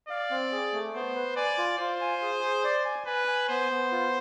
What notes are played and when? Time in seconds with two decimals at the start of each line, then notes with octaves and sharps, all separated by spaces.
0.09 D5 F5
0.31 C4
0.52 G#4
0.73 A3
0.94 B3 C5
1.16 B4
1.36 D5 G#5
1.58 F4
1.79 F4 C5
2.01 G#5
2.22 G#4
2.43 G#4
2.64 D5
2.85 G#5
3.07 B4 G#5
3.28 G#5
3.49 B3 C5
3.71 B3
3.92 F4